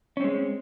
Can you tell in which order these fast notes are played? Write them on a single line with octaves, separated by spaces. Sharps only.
C#4 C4 G#3